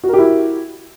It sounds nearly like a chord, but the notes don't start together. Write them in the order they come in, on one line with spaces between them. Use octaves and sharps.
F#4 A#4 G4 E4